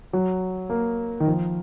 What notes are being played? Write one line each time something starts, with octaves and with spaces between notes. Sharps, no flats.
F#3
A#3
D#3
F3